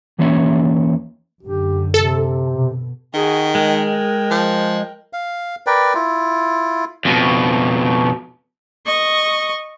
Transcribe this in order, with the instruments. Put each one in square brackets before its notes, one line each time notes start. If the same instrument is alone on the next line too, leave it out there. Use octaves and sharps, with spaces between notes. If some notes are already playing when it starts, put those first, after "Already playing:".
[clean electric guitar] E2 E3 A#3 C#4 C#5 E5
[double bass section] F#2 D3 [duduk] G4
[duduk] C3 [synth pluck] A4
[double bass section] B2
[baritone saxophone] D#3 [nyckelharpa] F#4 G#4
[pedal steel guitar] G#3 [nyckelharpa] A#4 G5
[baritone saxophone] F3
[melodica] F5
A#4 B4 D5 G5
E4 F4
[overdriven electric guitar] F2 B2
[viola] D#5 C#6